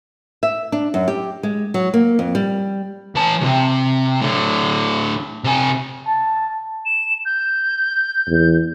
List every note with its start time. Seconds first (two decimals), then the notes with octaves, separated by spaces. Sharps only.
0.43 E5
0.72 D4
0.94 F#2
1.08 G4
1.43 G#3
1.74 F#3
1.94 A#3
2.19 F2
2.35 G3
3.15 E3 A5
3.41 C#2 C3
4.20 A2 D3
5.44 C3 G#5
6.07 A5
6.85 E7
7.25 G6
8.28 E2